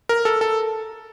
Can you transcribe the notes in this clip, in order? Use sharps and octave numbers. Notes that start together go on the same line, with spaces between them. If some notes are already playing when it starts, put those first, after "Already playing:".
A#4
A4
A4